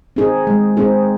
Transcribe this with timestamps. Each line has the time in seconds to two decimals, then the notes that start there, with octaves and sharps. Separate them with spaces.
0.16 C4 D#4 G#4
0.47 G#3
0.77 C4 D#4 G#4